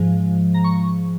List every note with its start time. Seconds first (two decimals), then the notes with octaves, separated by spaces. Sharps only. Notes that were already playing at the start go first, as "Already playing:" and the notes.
Already playing: G#2 F3 G#3
0.54 A#5
0.64 C#6